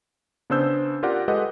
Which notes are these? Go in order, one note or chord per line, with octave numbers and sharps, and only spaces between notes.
C#3 B3 D4 C5 E6 G6
F4 G4 A#4 D5 F#5
G#3 G4 A4 B4 D#5 F#5